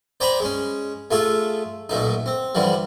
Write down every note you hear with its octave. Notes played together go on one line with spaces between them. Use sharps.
C5 D5 G5 G#5 A#5 B5
G#3 C#4
A3 F4 G#4 A4
B1 A#2 A3 D#4
C4
D3 E3 F3 G3